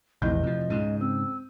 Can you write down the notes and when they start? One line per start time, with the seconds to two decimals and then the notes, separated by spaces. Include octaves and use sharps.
0.22 F1 A#1 E2 E4 D#5 G6
0.43 C3 F3
0.70 C#2 G#2 C#3 D#7
1.01 C4 E6